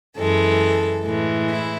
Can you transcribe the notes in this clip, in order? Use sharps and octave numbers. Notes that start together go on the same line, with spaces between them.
F#2 E3 G#3 A4
A2 E3 G#3
E4